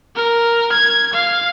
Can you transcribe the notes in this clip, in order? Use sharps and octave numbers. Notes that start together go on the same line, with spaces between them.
A#4
G#6
F5